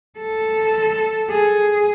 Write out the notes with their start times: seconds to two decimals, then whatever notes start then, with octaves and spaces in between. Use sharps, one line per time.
0.19 A4
1.30 G#4